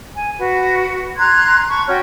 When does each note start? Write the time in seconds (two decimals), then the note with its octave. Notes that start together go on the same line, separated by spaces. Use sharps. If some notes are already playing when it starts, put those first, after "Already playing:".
0.15 G#5
0.38 F#4 B4
1.17 A#5 C6 F#6 G#6
1.68 A5 B5 C#6
1.88 C#4 F#4 G5